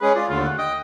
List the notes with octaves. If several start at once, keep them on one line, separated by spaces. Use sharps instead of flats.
G#3 C#4 G#4 B4
F4 D5
D#2 D3 A3 F4
F#5
D#5 G5